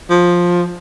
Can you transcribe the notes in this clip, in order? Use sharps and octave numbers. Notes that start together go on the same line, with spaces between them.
F3